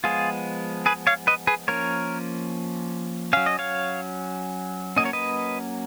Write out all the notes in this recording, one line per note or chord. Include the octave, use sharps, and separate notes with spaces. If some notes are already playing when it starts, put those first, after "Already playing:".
F3 G#3 B3 F4 G#4
G#4 B4
C#5 F5
B4 D#5
G#4 B4
F3 A#3 C#4 A#4 C#5
F#3 C#4 F5
D#5
C#5 F5
F#3 A#3 C#4 D#5
C#5
B4 D#5